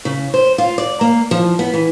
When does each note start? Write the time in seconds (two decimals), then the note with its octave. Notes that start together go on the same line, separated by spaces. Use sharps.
0.05 C#3
0.34 C5
0.58 F4
0.78 D5
1.01 A#3
1.31 F3
1.59 B3
1.74 E3